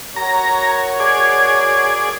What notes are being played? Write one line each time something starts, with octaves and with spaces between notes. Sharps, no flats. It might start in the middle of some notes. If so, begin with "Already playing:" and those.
F#4 A#4 C#5 A#5
G#4 D5 G#6